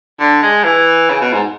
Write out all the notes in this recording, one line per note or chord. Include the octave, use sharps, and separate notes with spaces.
D3
G#3
E3
C#3
B2
G#2